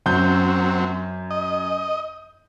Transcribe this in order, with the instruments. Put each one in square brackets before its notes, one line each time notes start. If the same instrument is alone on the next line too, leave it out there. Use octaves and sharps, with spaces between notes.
[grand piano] F#2 G6 [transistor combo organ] F#3 C4
[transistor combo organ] D#5